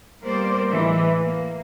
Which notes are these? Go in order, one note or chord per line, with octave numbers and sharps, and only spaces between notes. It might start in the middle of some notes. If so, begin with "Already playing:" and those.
G3 A#3 B3 A#4 C5 D5
A2 E3 G#3
A#3